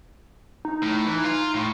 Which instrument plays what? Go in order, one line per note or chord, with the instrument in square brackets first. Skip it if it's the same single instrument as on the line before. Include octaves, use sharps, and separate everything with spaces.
[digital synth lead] D#4
[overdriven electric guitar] A2
E3
F4
A2